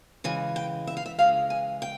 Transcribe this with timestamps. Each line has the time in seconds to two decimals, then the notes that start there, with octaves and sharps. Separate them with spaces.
0.24 C#3 E3 G#3 G#5
0.56 G5
0.87 E5
0.97 F5
1.06 E5
1.19 C#3 E3 G#3 F5
1.50 G#5
1.82 G5